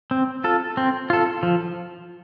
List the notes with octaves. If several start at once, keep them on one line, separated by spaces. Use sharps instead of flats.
C4
F4 A4
C4
F4 A4
F3